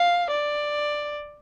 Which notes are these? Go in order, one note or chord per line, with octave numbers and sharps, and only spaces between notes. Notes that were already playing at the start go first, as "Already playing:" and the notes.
Already playing: F5
D5